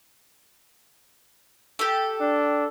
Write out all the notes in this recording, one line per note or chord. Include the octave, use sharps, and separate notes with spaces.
G4 A4
D4